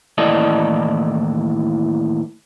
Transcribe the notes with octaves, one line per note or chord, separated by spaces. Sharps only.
D#2 A2 E3 A4 D5 D#5